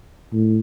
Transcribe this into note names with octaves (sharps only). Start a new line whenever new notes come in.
A2